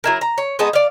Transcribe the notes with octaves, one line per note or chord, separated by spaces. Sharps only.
F#3 E4 A#4
A#5
C#5
G#3 B3 D#4 A5
D5 F5